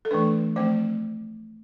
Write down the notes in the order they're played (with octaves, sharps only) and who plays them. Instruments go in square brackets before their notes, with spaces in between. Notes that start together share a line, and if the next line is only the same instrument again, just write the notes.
[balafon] A4
E3 A3 D4 B4
F3 A3 C4 C5